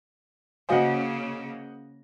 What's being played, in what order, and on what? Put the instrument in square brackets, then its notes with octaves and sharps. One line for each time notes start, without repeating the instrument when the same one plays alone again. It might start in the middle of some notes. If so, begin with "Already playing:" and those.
[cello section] C#3 A#3 [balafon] F#4 F5 G#5 [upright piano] C5 D#5 F#5